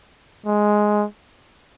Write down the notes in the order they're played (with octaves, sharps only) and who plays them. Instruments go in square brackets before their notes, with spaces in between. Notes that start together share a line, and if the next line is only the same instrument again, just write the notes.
[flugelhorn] G#3